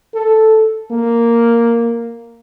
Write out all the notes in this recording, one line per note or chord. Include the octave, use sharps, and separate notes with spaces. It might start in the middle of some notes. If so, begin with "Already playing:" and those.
A4
A#3